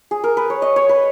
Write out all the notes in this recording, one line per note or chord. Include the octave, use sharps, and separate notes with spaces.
G#4
A#4
B4
C#5
D#5
C#5
B4